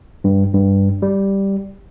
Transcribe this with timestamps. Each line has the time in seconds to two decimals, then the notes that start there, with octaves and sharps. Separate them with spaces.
0.24 G2
0.54 G2
1.02 G3